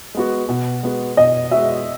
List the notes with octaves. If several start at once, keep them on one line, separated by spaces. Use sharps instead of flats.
G#3 B3 F#4
B2
G#3 B3 F#4
B2 D#5
G#3 B3 F#4 E5